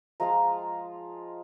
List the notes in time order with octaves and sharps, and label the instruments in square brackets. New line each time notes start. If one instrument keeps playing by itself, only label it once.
[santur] F3 G#3 F4 F5 A#5